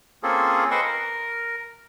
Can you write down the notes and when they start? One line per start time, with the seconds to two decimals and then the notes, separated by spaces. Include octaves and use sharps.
0.23 A#3 C4 C#4 F4 G#4 A4
0.71 B4 C5 D#5 G5 C6 C#6
0.84 A#4